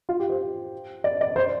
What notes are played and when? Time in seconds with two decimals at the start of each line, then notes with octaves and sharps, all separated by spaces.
0.09 F4
0.20 G4
0.30 C5
1.04 D5
1.21 D5
1.36 C5